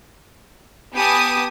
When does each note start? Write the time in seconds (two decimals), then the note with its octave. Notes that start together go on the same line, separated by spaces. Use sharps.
0.95 B3 G4 A4 G#5 D#6